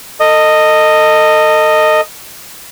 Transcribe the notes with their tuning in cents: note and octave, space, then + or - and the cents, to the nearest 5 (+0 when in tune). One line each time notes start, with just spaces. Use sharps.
A4 +30 D#5 -5